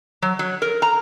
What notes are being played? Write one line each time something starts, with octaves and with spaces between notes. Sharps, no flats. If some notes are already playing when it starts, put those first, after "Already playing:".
F#3
F#3
A#4
A#5